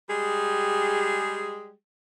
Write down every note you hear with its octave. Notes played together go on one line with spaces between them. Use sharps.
G3 G#3 G4 G#4